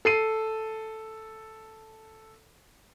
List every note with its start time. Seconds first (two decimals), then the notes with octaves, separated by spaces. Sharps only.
0.05 A4 C7 D#7